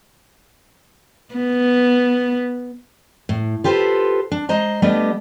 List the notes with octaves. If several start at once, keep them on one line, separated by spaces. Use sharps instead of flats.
B3
A2
F4 G4 A4 B4 C5
D4
G#3 C5 D#5 A#5
G3 A3 B3 D4 G4 D#5